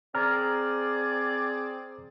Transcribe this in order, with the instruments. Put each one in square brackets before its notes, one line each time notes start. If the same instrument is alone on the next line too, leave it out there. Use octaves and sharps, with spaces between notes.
[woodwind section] C4 G#4 D5 [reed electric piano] A#5 F6